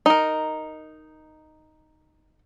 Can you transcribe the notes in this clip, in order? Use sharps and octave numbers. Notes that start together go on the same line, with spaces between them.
D#4 A#4